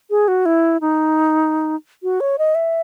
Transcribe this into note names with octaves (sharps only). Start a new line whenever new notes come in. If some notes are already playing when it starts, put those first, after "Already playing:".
G#4
F#4
E4
D#4
F#4
C#5
D#5
E5